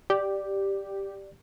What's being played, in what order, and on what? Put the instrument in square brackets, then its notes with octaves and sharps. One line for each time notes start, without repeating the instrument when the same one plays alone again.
[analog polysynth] G4 [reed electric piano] D5